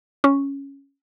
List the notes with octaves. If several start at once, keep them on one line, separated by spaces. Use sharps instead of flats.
C#4